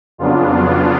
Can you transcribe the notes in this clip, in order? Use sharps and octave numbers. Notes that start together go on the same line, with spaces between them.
F2 C#3 F#3 B3 D4 F4